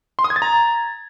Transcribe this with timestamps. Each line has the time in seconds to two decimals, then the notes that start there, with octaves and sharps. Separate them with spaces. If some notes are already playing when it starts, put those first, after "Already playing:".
0.19 C6
0.24 D#6
0.30 G#6
0.36 A6
0.42 A#5